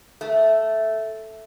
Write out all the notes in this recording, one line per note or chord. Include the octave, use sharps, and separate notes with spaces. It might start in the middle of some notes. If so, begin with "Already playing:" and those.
A3